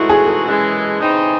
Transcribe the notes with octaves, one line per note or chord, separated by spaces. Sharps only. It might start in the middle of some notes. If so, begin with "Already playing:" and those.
Already playing: A2 E3 G#3 D#4 E4 F#4
G#4
A4
F#2 E3 G#3
C#3 E3 C4 D#4